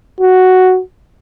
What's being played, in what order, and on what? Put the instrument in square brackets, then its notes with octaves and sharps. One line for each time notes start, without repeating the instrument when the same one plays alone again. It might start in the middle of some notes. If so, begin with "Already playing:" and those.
[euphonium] F#4